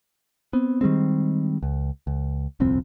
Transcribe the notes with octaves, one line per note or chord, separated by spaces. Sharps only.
B3 C4
D#3 G3 G#3 C4
C#2
C#2
D#1 C2 F2 C4